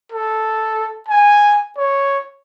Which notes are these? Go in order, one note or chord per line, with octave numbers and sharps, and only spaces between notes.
A4
G#5
C#5